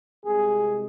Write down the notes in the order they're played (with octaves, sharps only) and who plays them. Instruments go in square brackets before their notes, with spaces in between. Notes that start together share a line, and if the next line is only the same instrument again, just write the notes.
[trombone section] C2 C3 G#3 G#4